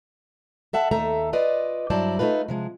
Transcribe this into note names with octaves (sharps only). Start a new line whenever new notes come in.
A4 E5 F#5 A5
D#2 A3 A4 E5 A#5
F4 B4 D5 D#5
G2 F#3 E4 C5 D5 A5
A3 B3 D#4 F4 B4
C3 F3 G#3